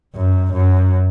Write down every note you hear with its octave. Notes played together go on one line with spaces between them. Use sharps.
F#2
F#2